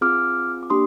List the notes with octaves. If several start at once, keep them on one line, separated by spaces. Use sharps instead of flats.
C4 F4 G#4 D6 F6
D6
A#3 D4 G4 C6 D#6